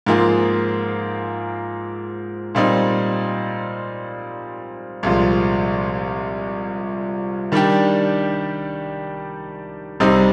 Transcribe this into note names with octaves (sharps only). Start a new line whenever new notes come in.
G#2 F3 A#3 F4 G#4
A#2 G3 C4 D#4
C2 A#2 F3 G#3
D#3 G3 D4 G4
C2 C3 G3 C4 D#4